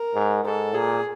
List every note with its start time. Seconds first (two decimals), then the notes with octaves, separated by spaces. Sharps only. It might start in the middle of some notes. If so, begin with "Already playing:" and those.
Already playing: A#4
0.15 G#2
0.44 G#2 A4
0.74 A#2 G#4